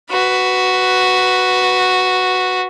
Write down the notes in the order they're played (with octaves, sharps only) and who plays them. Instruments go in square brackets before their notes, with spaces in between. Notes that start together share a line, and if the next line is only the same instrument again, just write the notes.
[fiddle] F#4 B4